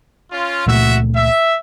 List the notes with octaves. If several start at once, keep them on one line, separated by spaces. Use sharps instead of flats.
C#4 F4
C#2 A#2 A3 F#4 E5
E5